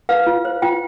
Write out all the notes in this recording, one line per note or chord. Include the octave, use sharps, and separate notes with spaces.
B4 F5
F4
C5
F4 G5